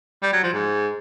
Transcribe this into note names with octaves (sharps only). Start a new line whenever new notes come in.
G3
F#3
F3
G#2